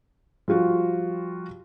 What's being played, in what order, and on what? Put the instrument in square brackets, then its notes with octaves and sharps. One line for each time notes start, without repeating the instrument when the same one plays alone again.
[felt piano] F3 G3 F4 F#4